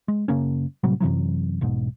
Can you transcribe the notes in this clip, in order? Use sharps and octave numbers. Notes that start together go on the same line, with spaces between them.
G#3
F#1 C#3 A#3 C#4
A2 C3 F#3 G3
F#2 C3 E3 F#3
E1 B1 G#2